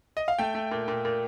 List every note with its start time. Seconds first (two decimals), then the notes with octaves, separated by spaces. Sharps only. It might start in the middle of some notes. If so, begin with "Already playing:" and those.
0.17 D#5
0.28 F5
0.39 A3 G5
0.55 A3
0.71 A#2
0.88 A#2
1.05 A#2